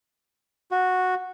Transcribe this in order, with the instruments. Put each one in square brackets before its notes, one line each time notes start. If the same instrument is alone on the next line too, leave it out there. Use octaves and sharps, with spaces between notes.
[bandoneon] F#4